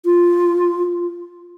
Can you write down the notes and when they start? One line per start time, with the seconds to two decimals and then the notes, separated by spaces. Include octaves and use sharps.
0.05 F4